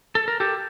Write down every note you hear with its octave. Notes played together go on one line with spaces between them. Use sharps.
A4
A#4
G4 A4